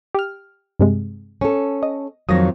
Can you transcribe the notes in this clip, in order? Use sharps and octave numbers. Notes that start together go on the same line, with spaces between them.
G4 F6
G2 C3 G#3
C#4 A4
D#5
F2 D#3 F#3 D#6 A#6